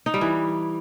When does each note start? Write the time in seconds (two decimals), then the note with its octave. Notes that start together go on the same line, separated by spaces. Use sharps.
0.06 D#4
0.14 G3
0.21 E3